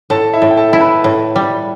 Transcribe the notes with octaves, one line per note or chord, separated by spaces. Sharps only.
A2 A4 A5
E4 E5
A2
G5
A4 A5
E4
B4 B5
A2
G3